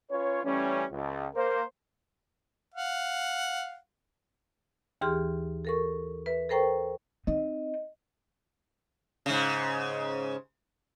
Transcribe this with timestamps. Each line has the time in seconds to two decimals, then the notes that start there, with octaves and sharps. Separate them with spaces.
0.10 C#4 F4 B4 C#5
0.44 E3 G3 A3 C#4
0.91 C#2
1.35 A#3 A#4 C5
2.74 F5 F#5
5.01 D#2 E3 G4 G#4 C6 F6
5.65 A4 A#4 C#6
6.26 B4 E5
6.49 A4 A#4 C5 G5 A#5 C#6
7.27 C4 D#4 D#5
9.26 G#2 C#3